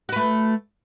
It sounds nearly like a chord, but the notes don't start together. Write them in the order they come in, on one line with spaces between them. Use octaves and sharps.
F#4 B4 A3